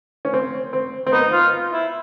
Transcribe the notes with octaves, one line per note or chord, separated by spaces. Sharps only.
C#4
C4
C4
C4
B3 D#4
F4
E4